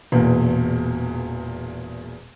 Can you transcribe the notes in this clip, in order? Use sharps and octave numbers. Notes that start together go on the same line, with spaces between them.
E1 E2 A#2